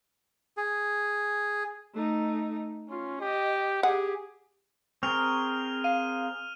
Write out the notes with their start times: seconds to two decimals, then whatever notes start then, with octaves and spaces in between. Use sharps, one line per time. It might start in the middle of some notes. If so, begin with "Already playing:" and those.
0.57 G#4
1.94 A3 D#4
2.89 C#4 F4
3.21 G4 D#5
3.83 G4 G#4 F#5
5.03 C4 G#4 A#4 C#6 F6 F7
5.84 F5 D#7